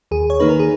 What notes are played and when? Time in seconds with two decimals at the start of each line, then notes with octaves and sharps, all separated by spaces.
0.11 D#2 G#4
0.30 C#5
0.40 D#3 A#3 D#4 B4
0.49 A#4
0.59 G#4